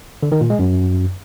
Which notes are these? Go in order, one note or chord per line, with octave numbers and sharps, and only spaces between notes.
D3
D#3
A#2
G#3
F#2